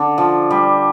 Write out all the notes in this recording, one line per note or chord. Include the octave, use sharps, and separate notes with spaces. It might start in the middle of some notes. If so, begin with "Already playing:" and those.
Already playing: D3
F3
G3